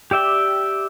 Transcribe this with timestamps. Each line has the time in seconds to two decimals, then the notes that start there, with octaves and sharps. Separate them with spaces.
0.11 G4 D5 E5 G5